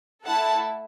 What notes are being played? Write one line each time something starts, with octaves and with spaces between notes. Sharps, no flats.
A3 E4 A4 F#5 A5